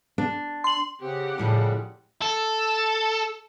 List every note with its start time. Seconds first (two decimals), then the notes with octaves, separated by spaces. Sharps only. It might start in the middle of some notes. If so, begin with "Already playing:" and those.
0.18 D4
0.64 C6 F#7
1.01 C#3 C4 G4 F#5
1.38 F2 A2 C#3 F3 G3
2.22 A4